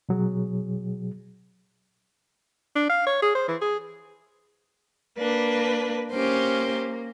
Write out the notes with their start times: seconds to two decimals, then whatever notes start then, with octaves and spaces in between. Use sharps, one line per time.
0.09 B2 F#3 G#4
2.75 D4
2.89 F5
3.06 C#5
3.22 G#4
3.35 C5
3.48 E3
3.61 G#4
5.17 A#3 D4 B4
6.12 A#3 C#4 G4 C5